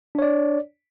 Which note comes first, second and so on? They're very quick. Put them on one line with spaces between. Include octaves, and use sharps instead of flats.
D4 C#5 D5